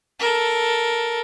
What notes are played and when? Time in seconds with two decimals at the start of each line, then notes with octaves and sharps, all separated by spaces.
0.19 A4 A#4